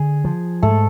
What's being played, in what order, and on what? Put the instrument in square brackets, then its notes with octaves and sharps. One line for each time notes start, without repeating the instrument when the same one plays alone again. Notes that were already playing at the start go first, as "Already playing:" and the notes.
Already playing: [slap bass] D3 [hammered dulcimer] G#4
[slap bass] F3
[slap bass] G#2 [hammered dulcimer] A3 A4